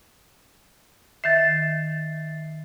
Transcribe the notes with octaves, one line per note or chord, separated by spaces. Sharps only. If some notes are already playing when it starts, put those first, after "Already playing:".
D#3 E5 A6 C7